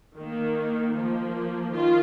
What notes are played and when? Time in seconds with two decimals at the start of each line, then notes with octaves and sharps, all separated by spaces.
0.18 D#3 A#3
0.96 F3 A#3
1.73 D#3 F4